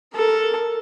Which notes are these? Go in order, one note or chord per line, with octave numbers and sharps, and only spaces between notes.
A4 A#4